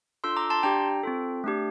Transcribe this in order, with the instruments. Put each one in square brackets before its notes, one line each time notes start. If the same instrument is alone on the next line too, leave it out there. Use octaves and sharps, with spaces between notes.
[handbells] D4 F4 A4 C6 E6
A#5 D6
A5 C6
D4 G4 G5 A#5
C4 F4 A4
A3 D4 G4